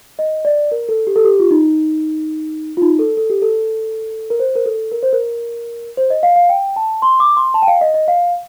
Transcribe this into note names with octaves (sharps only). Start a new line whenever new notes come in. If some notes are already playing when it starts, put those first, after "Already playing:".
D#5
D5
A#4
A4
G4
A4
G4
F4
D#4
F4
D#4
A4
A4
G4
A4
A#4
C5
A#4
A4
A#4
C5
A#4
C5
D#5
F5
F5
G5
A5
C6
D6
C6
A5
G5
F5
D#5
D#5
F5